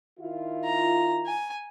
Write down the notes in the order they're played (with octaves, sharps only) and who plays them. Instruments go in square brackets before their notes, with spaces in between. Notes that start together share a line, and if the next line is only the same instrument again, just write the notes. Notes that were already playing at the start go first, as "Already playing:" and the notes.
[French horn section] D#3 E4 F4
[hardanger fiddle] A#5
G#5